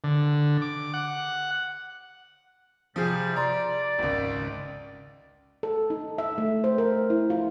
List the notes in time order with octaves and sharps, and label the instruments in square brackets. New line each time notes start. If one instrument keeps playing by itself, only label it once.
[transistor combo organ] D3
D6
F#5
[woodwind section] C3 G3 [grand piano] F3 G#4
[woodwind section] D5 [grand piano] A#5 C6
[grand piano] G#1 C#2
[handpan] A4
D#4
E5
A3
C5
A#4
E4
F4